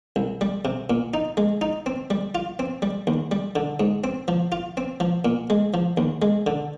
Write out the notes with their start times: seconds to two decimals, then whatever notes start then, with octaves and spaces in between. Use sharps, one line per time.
0.16 C2
0.41 G3
0.65 C3
0.90 A#2
1.14 D#4
1.37 G#3
1.61 D#4
1.86 C4
2.10 G3
2.35 F4
2.59 C4
2.82 G3
3.07 D#2
3.31 G3
3.56 D3
3.80 G#2
4.04 C4
4.28 F3
4.52 F4
4.77 C4
5.00 F3
5.25 A#2
5.50 G#3
5.74 F3
5.97 D#2
6.22 G#3
6.47 D3